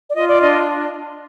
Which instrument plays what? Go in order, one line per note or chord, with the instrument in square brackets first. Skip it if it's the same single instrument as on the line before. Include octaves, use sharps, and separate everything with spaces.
[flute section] D5
F4 D#5
D5
D4 D#5